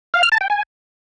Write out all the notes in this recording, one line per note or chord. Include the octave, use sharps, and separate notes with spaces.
F5
F6
A5
G5
G#5